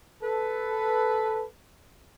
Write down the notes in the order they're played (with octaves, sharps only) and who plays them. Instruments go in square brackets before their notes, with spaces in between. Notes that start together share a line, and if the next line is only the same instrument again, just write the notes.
[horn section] A4 B4